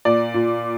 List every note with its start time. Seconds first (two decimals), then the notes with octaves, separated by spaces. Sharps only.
0.05 A#2 D5
0.34 A#2